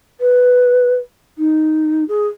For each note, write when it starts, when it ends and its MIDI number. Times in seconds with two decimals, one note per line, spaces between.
0.21 0.95 71
1.38 2.04 63
2.09 2.27 68